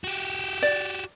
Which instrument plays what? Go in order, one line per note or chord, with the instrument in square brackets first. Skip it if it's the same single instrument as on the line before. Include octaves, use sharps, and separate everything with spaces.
[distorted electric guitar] F#4 G4
[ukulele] D5